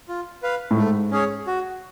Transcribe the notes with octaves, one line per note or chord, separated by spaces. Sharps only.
F4
B4 F5
A2
G#2 A3
C#4 G#4 C#5
F#4